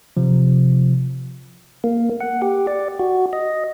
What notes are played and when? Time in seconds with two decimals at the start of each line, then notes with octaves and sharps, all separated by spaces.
0.17 C3 F3
1.84 A#3
2.20 F#5
2.42 G4
2.67 D5
2.99 F#4
3.33 D#5